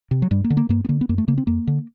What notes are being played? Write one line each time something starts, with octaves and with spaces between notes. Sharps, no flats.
C3
F#3
G2 G3
A#3
D3
A#3
G2 A#3
B3
D3 A#3
B3
F#2 A#3
A3
C#3 A#3
C4
F2 A#3
D3